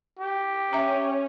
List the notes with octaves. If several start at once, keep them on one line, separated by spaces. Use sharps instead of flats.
G4
C#4 E5 A#5